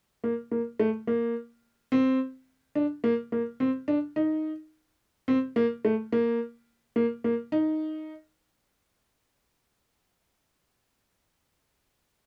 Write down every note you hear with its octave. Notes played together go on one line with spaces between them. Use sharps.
A#3
A#3
A3
A#3
C4
D4
A#3
A#3
C4
D4
D#4
C4
A#3
A3
A#3
A#3
A#3
D#4